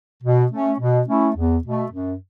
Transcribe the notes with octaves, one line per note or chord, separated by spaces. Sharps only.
B2
A3 C#4
B2
A3 C#4 E4
E2
B2 A3
F#2